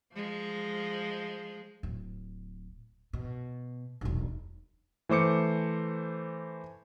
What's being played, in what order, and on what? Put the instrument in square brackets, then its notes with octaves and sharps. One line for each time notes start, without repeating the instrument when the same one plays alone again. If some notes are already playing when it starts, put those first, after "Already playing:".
[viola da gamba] F3 G#3
[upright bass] D1
B2
E1 B1
[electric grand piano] E3 A3 C5 D6 C#7